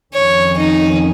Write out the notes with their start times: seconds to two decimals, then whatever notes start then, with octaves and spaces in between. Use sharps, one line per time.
0.13 F2 D#3 C#4 C#5
0.57 D#4